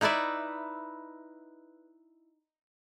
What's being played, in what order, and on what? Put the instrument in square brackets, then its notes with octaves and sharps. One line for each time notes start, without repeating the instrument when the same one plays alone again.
[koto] D#4 E4 B4 D5 E5